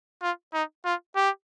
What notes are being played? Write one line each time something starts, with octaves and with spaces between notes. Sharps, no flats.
F4
D#4
F4
G4